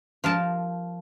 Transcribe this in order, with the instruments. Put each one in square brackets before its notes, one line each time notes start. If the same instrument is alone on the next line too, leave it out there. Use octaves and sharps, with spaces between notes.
[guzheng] F3 A#4 A5